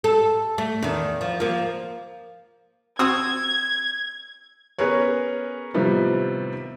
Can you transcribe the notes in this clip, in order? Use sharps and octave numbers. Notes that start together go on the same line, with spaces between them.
A4
A3
E2 D#3
F3
F3 A#3
C4 F#4 D#6 E6 G#6
B3 C#4 G#4 A#4 B4 C#5
A2 C3 D#3 F3 G3 B3